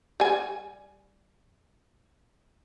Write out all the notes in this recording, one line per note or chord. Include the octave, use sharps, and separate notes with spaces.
G3 G#5